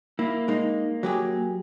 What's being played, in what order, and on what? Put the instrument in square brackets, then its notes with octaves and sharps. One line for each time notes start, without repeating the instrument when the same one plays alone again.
[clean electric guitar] A#3 [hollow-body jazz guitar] E4
[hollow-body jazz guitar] G#3 D#4
F#3 G4 G#4